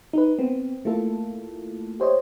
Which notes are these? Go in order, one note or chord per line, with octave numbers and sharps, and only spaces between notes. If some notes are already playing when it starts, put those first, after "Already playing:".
D#4 B4
B3 C4
A3 A#3 E4 F4 A4
G4 C5 C#5 D#5